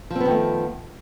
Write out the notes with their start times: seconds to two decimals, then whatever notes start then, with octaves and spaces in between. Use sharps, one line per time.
0.10 F3
0.15 C4
0.20 B3
0.25 D#3
0.30 A3